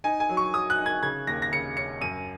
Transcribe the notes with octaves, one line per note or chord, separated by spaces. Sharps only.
D#4 G#5
G#5
F#3
C#6
F#3 D#6
F#6
D#4
G#6
C#3 G#6
D#2 A#6
A#6
C#3 C#7
C#4 C#7
F#2 D#7